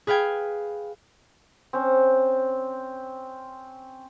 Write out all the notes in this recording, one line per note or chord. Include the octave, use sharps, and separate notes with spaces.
G#4 B4 F5 G5 G#6
C4 C#4